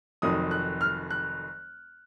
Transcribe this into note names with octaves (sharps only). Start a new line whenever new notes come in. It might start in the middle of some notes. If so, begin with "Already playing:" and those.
F1 F2 D#3 F#3 D#6
F#6
F6
F#6